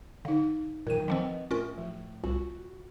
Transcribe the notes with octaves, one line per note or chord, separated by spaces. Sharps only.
D3 D#4 F5
F2 A#2 D#3 F#3 A#4 G5 D#7
D#3 F3 C4 B4 D#5
A2 C#4 F4 A#4 C#6
F3
C2 F4 F#4